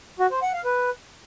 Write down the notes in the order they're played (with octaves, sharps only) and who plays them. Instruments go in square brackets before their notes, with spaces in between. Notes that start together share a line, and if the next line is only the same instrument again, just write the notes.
[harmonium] F#4
C5
F#5
F5
B4